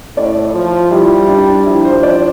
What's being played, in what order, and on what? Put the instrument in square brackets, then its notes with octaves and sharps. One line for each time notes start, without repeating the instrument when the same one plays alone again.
[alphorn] A2 [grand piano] D5
[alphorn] F3
[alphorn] G3 [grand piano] E4
[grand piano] D4
[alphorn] F3 [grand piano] E4
[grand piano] C5
D5